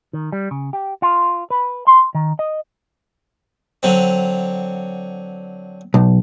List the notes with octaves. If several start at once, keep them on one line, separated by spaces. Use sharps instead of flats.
D#3
G3
C#3
G4
F4
B4
C6
D#3
D#5
D3 F#3 C4
B1